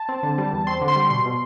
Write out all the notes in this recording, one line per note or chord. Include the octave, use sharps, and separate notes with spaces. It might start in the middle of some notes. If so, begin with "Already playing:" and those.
Already playing: A5
C4
D3
G3
E2
C4 C6
D3
C6
G3
B2 C6
B2